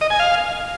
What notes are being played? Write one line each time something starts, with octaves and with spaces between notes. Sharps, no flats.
D#5
G#5
F5